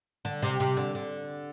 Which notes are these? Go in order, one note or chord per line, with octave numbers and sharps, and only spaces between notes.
D3
C3
C3
D3
D3